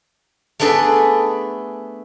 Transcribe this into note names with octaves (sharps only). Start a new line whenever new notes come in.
A3 B3 D4 G#4 A4